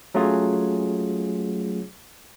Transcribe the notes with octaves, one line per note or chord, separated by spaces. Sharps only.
F#3 A3 C#4 F4 G#4